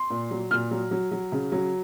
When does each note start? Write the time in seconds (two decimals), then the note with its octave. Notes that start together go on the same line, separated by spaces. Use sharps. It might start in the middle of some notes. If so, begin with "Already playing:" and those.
Already playing: C6
0.10 A#2
0.31 F#3
0.51 A#2 F6
0.71 F#3
0.91 F#3
1.11 F#3
1.32 C#3
1.52 F#3